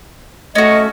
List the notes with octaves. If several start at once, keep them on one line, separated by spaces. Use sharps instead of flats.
A3 C#4 F#4 D#5